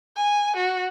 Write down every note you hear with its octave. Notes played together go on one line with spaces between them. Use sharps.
G#5
F#4